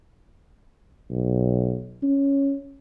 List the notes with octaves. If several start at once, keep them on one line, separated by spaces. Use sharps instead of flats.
B1
C#4